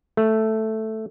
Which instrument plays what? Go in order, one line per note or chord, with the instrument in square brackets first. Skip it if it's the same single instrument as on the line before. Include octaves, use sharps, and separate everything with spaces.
[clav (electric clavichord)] A3